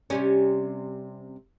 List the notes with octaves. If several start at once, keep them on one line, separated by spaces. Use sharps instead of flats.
C3 G3 C#4